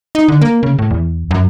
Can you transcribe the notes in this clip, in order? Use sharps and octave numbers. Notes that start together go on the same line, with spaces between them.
D#4
D3
A#3
C#3
A2
E2
F#2